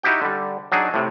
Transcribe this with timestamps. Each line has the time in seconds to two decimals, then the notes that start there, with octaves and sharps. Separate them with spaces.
0.03 D#4 E4 F#4 G4 G5
0.22 D3 G3
0.72 F#3 D4 D#4 G#4
0.94 A2 C3